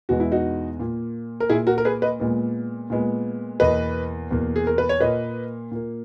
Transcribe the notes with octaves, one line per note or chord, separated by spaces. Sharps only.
E2 B2 G#3 B3 F#4
E4
D#4 F#4
A#2 A#3
A#4
A#2 A#3 E4 G#4
F#4 A#4
A#4
G#4 B4
B4 D#5
A#2 G#3 B3
A#2 G#3 B3
E2 B2 A#3 B4 D#5
E2 B2 A#3
G#4
A#4
B4
C#5
A#2 A#3 B4 D#5
A#2 A#3